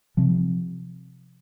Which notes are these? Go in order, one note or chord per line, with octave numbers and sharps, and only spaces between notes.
C3 F3 C4